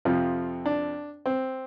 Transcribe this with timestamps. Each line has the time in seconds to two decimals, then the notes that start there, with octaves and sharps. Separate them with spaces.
0.05 F2 C3 F3 F4
0.66 D4
1.26 C4